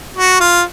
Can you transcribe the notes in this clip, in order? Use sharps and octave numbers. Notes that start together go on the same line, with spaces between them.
F#4
F4